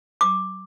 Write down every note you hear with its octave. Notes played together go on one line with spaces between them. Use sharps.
D6